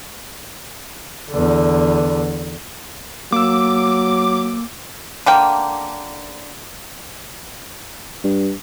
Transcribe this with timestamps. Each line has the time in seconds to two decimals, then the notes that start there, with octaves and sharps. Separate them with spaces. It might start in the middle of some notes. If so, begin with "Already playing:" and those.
1.30 E2 D3
3.32 F#3 A#3 D6 E6
5.26 D3 A#3 G5
8.24 G2